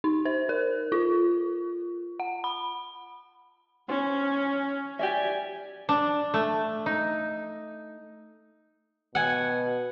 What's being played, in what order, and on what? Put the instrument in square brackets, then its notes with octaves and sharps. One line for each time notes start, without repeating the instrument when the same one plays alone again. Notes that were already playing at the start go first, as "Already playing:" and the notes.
[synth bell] D#4
C5
A#4
F4
F#5
B5
[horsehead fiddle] C#4 [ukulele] C5
[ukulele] G4 D5 E5 [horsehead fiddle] G#5
[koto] D4
A3
D#4
[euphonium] B2 [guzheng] F#5 G#5